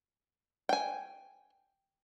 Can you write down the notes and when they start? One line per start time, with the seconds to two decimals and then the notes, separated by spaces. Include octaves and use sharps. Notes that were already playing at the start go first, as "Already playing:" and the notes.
0.69 G5 G#5